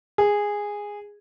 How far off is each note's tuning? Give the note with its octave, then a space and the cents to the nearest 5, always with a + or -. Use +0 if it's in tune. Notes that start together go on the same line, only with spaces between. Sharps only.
G#4 -10